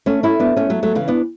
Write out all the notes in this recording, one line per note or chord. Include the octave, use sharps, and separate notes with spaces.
A3 C#4
C#4 E4
B3 D4
A3 C#4
F#3 A3
F#3 A3
C#3 E3
B3 D4